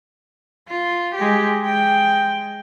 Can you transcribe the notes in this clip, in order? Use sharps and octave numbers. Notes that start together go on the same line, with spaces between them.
F4
G#3 G4
G#3 G5